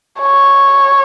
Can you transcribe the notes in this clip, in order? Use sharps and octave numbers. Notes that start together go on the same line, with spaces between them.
C#5